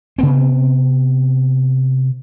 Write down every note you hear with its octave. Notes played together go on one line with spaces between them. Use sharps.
C3 B3 C4